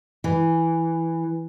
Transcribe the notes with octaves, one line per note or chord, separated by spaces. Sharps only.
E3